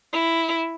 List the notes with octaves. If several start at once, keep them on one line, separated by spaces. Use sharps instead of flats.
E4